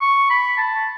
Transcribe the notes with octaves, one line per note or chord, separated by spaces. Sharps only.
C#6
B5
A5